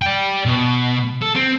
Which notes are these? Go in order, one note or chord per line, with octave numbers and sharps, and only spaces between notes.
D5 G5
B2
A4
C4